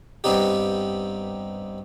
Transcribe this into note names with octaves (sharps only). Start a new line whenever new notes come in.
G2 B3 C4 D#4 G4